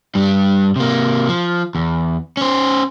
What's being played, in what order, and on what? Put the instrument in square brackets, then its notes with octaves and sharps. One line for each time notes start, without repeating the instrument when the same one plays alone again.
[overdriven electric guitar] G2 G3
C3 A#3
F3
E2
C#4 C5